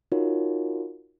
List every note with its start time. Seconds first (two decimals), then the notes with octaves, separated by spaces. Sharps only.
0.12 D#4 F4 F#4 A#4 C#5